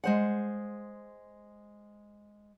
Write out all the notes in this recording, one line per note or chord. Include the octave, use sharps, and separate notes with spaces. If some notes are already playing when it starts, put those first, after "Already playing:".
G#3 C5 F#5